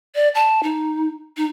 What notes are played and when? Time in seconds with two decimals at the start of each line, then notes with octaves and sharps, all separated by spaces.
0.15 D5
0.35 A5
0.63 D#4
1.37 D#4